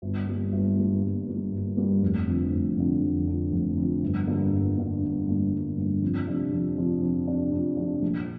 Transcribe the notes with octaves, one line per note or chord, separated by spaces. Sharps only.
G1
G2 G3 A#3
G1
G2 G3 A#3
G1
G2 G3 A#3
G1
G2 G3 A#3
F1
F2 D3
F1
F2 D3
F1
F2 D3
F1
F2 D3
G1
G2 D3 A#3
G1
G2 D3 A#3
G1
G2 D3 A#3
G1
G2 D3 A#3
F2
C3 F3 D4
F2
C3 F3 D4
F2
C3 F3 D4
F2
C3 F3 D4
A#1